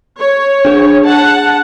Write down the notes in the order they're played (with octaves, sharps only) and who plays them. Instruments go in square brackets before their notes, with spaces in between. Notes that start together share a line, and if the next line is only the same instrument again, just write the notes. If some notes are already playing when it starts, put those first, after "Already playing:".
[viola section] C#5
[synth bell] D4 G#4
[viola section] F#5 A5